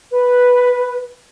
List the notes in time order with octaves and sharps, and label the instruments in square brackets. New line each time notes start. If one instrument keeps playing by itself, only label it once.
[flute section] B4